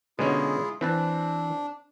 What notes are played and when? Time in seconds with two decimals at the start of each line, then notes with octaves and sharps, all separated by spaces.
0.19 B2 D3 G#3 C#4 E4 F4 G#4
0.81 E3 C4 D4 B4 A5